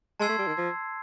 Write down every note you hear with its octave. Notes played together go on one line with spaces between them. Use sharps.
G#3 A5 C6 E6 G#6 C7
A3
G3
D#3
F3